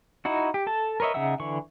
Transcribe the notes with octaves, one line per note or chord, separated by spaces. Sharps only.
D#4 E4 F#4
G4
A4 A5
A#4 B4 C#5 D#5 E5
C#3 D#4 E5 F#5 E6
D3 E3 C#6